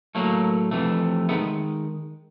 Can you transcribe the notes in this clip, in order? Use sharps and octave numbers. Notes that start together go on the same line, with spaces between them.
A2 F#3 A3 A#3
F2 C3 E3 A3
D#3 G#3 A3 B3